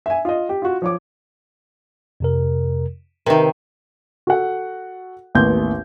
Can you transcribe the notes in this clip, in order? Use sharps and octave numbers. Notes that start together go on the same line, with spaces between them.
E5 G#5
F4 D#5
G4
F4 F#4
F3 C#5 D6
F2 C3 A#4
C3 D#3 A#4 B4 E5
F#4 A4 F#5
A1 D#2 B3 C6 G6